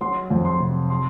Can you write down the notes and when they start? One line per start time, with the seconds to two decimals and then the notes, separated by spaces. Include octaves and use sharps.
0.01 F#3 C6
0.30 F2
0.45 C6
0.60 C3
0.90 C6